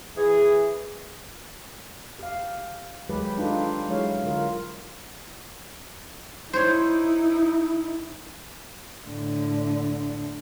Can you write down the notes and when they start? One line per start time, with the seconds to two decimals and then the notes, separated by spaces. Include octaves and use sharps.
0.17 E3 G#4
2.19 G4 F5
3.09 D#3 F#3 G#3 G4 B4
3.37 D4 D#4 F4 G4 A4 B4
3.89 F#3 G#3 E4 C#5 F5
4.23 D3 F4 A#4
6.53 D#4 E4 C5 C#5
9.05 A2 D3